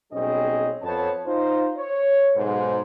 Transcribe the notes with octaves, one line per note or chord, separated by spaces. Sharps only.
B1 G3 C4 C#4 G#4 D#5
F2 B3 C5 C#5 A5
D#4 F4 C5
C#5
B1 G#2 C5